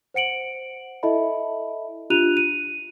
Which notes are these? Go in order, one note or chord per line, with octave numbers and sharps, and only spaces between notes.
C5 F#5 C#7 D7 F#7
E4 A4 D#5 E5 A5 B5
D4 F4 G4 F#6 D#7 F7
D#7